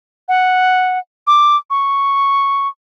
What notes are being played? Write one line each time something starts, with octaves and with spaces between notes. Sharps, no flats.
F#5
D6
C#6